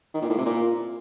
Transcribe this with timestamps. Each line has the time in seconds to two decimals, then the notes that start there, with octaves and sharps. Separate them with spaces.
0.14 D#3
0.22 A#2
0.30 A2
0.38 C3
0.46 A#2